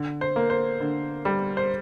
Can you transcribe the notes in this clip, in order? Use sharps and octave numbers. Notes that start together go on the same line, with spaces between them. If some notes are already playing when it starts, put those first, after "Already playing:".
Already playing: D3
C5
A#3
C5
D3
G3
C5